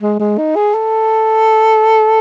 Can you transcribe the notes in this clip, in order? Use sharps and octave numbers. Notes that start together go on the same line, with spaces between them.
G#3
G#3
D#4
G#4
A4